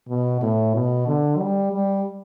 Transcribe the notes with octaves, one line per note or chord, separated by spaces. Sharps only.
B2
A2
B2
D3
G3
G3